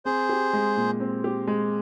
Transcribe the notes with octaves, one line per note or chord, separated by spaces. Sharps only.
C4 G#4 C5
G4
G#3
A#2
C4
G4
G#3